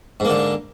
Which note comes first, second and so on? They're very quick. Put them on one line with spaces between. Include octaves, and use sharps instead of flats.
G#2 A#3 D3